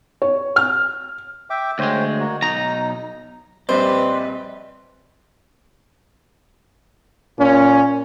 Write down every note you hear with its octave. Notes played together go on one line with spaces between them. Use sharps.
C#5
F6
E5 G5 D6
D2 G#3 C5 C#5 G5
A#3 F#4
B1 D#4 A#5
A#1 G3 C4 G4 B4 C5 D5 D#5
A#2 C#4